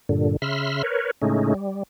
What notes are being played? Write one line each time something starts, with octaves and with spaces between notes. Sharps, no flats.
G2 A#2 D3
C#3 E5 B5 C6 F6
A#4 B4 C#5
A2 C#3 G#3 A3 C#4 D#4
G3